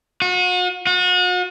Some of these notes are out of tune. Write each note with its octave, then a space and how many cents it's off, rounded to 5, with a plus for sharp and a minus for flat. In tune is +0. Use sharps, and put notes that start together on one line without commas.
F#4 -40
F#4 -40